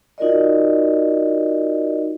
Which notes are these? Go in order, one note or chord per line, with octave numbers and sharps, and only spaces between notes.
D#4 F4 F#4 A#4 D5 D#5